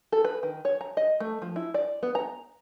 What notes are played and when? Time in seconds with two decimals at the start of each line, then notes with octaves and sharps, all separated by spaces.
0.12 A4
0.25 B4
0.43 D#3
0.65 C#5
0.81 A#5
0.97 D#5
1.20 A3
1.42 F3
1.56 E4
1.74 D5
2.03 B3
2.15 A#5